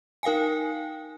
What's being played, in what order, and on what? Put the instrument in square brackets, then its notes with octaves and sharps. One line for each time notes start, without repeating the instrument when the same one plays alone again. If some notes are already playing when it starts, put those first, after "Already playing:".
[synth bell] D#4 A#4 F5 G5 G#5